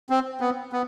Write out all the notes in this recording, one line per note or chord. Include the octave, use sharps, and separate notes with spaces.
C4
B3
B3